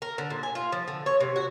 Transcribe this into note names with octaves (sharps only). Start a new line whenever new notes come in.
A#4
D3
A#2
G#5
F4
F3
D3
C#5
C3
F#4